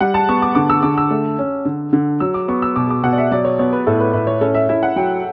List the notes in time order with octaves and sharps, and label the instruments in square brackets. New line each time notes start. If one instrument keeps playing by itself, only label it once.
[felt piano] G3 [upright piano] F#5
[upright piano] A5
[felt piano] B3 [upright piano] C#6
[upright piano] D6
[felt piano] D3 [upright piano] D6
[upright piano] E6
[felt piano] D3 [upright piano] D6
[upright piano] E6
[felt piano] A3
C#4
D3
D3
[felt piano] F#3 [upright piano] E6
[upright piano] D6
[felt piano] B3 [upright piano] C#6
[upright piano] E6
[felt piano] B2 [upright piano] D6
[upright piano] D6
[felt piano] B2 [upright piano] F#5
[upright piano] D5
E5
[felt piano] F#3 [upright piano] D5
[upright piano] C#5
[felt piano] B3 [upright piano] C#5
[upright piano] B4
[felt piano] A2 [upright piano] A4
[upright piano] B4
[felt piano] A2 [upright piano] B4
[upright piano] C#5
[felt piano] C#4 [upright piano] A4
[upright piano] E5
[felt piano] E4 [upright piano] E5
[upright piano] F#5
[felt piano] F#3 [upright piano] G5